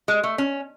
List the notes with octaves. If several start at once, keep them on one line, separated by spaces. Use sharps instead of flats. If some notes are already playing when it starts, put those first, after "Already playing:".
G#3
A3
C#4